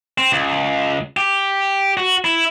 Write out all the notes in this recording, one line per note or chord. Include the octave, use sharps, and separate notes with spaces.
C4
C#2
G4
F#4
E4